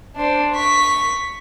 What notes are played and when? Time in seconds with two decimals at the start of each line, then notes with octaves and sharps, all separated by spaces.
0.16 D4 C5
0.54 C#6 B6